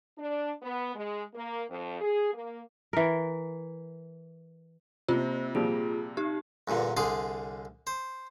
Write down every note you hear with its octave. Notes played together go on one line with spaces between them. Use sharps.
D4
B3
G#3
A#3
F2
G#4
A#3
E3 A#4
C3 A#3 F4 C5
A#2 F3 G3 G#4
D#4 G4
E2 G2 A#2 D3
C2 D3 G#4 C6 D6
C5